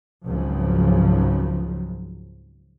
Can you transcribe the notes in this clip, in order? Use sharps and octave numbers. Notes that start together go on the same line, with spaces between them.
G#1 C#2 C#3 F3 F#3